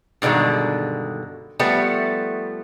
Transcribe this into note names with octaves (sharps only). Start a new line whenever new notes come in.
G2 B2 D3 D#3 G#3
F3 G3 A3 B3